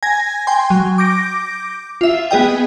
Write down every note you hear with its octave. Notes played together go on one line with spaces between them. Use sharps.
G#5 G#6 A#6
G5 G#5 C6
F#3
D6 G6 A#6 D7
F4 E5
B3 G#4 D#5 G5